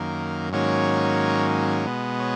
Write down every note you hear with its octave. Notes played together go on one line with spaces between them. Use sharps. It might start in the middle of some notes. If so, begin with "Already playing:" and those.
Already playing: F#2 D#3 A#3
G#2 D#3 F#3 A#3 C#4 C#5
B2 G#3 B3
C#5